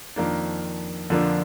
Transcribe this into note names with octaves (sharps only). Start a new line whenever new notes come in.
F2 D#3 A#3 D4
F2 D3 F3 A#3 D4